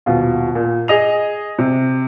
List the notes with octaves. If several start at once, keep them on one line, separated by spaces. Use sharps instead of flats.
D#1 B2 F4
A#2
G#4 D#5 F7
C3